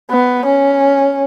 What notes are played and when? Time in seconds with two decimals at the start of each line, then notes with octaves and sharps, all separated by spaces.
0.11 B3
0.46 C#4